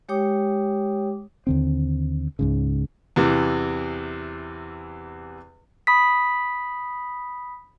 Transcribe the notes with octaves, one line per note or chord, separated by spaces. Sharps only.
G#3 G4 C#5 G5 D6 D#6
D#2 D3 C4
C#2 G#2 C#3
E2 C3 E3
B5 D#6 B6